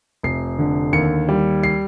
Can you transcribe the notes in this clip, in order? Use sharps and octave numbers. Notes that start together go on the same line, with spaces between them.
F1 C7
D3
D#2 C#7
G3
C7